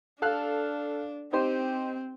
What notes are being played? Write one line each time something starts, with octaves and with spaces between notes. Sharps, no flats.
D4 A4 F5 F#6
C4 D#4 G4 C5